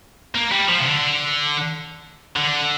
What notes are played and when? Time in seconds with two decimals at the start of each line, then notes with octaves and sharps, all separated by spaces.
0.35 A#3
0.52 G3
0.69 F3
0.80 C3
0.85 D3
2.36 D3